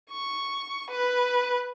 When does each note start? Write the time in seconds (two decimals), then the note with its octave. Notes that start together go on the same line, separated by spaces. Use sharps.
0.11 C#6
0.90 B4